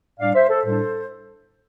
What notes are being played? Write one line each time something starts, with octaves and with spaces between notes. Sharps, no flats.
A2 G3 D4 D5 F5
C5 E5
A4 C5
A2 G3 D4 A4 C5